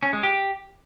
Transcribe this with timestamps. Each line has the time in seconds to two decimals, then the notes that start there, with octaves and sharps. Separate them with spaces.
0.03 C#4
0.13 G#3
0.23 G4